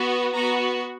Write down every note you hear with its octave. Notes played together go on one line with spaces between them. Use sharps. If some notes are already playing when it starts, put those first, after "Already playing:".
Already playing: B3 F#4
B3 F#4 A#5